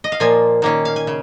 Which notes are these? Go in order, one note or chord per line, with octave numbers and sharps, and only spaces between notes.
D#5
F5
A#2 F3 A#3 G#5
D#3 A#3 C#4
F5
G#5
C#3